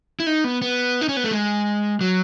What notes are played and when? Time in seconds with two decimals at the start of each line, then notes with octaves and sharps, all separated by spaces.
0.20 E4
0.27 D#4
0.44 B3
0.62 B3
1.01 D#4
1.09 C#4
1.17 B3
1.24 A3
1.32 G#3
2.01 F#3